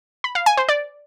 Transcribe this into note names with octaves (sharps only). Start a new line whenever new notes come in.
B5
F5
G#5
C5
D5